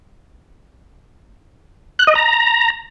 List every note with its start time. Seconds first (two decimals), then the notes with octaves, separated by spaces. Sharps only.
1.99 F#6
2.07 D#5
2.15 A#5